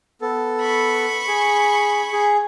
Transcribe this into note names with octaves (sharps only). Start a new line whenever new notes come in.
B3 A4
B5 C#6
G#4
G#4